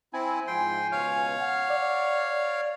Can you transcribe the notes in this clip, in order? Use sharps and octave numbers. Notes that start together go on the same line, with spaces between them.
C4 E4 G#5
G#2 F3 G5 C6
C#2 B2 C#5 F5
F#5
D5